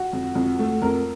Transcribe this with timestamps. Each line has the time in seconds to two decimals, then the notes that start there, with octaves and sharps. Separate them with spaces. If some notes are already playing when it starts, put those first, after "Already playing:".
Already playing: F#4
0.13 F2
0.35 F2
0.59 A3
0.82 F2 A#4